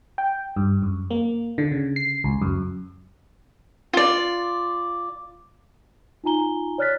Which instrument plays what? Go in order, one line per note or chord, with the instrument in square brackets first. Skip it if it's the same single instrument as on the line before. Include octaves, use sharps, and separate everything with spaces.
[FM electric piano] G5
G2
F#2
A#3
D3
C#3
C7
C#2
F#2
[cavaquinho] F4 D5
[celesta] D#4 F4 G#5 A#5 G7
C#5 D5 F6 F#6 A6 B6